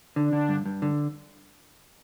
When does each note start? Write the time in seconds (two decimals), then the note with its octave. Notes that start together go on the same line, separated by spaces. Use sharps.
0.16 D3 D4
0.33 D3
0.49 G2
0.66 G2
0.82 D3